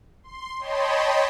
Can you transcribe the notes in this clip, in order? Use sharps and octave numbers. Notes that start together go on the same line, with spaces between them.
C6
C#5 D#5 G5 A5 B5 C6